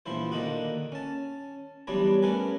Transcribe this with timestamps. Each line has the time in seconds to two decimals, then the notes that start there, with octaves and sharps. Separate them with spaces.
0.06 A#1 E3 F3 E4 C5
0.32 D3 D#3 A#3 D#4 F#4
0.92 C#4 A5
1.87 E3 F#3 G3 B3 D4 C#5
2.23 A3 C#4 A#4 B4 G#5